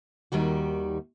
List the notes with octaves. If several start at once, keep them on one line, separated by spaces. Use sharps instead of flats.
D#2 D#3 G3 F#4